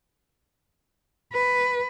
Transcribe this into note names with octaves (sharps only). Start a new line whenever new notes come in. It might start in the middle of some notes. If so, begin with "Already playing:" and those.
B4